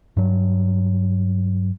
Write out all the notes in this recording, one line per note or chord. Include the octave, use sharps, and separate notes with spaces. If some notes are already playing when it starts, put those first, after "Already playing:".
G2 F#3